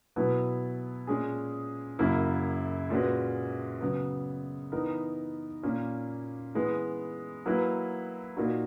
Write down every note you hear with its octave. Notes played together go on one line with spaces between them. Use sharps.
B2 F#3 B3 E4 B4
A#2 G#3 C#4 G#4
F#2 C#3 F#3 A#3 E4
A#2 G#3 C#4 F#4 B4
C#3 F#3 B3
E3 B3 D#4 A#4
A#2 A#3 C#4
E3 G#3 B3
F#3 A#3 E4 B4
A#2 A#3 D#4 F#4